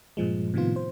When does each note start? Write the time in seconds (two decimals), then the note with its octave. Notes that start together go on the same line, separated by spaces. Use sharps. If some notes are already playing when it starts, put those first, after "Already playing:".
0.17 G2 A#2 F3 G#3
0.54 A2 C3 D#3 F3 B3 F4
0.76 C5